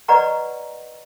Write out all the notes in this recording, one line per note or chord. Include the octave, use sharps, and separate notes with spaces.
B4 D5 D#5 F#5 A#5 C#6